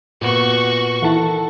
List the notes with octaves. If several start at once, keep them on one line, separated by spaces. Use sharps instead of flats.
A#2 B3 F#4 C#6
D#3 E3 E4 A4 F#5 A5